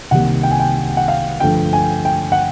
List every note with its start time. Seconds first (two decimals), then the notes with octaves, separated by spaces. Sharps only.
0.11 C2 C3 D#3 G3 A#3 F#5
0.43 G5
0.51 G#5
0.60 G5
0.97 F#5
1.08 F5
1.40 G2 D3 F3 A3 G5
1.73 G#5
2.05 G5
2.32 F#5